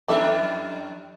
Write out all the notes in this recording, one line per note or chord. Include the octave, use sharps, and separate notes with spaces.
F2 E3 G3 D4 A4 E5